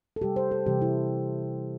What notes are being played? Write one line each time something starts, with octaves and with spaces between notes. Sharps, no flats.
A4
C3 G3 G4
C5
A4
C3 E3 G3 G4
E4